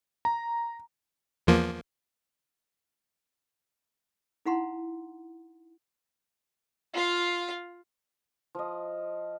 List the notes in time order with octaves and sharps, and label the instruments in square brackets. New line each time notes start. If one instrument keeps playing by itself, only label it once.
[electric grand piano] A#5
[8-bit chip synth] E2 F3 A#3
[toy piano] D#4 E4 F5 F#5 A#5 C6
[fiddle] F4 F5
[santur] F3 D#5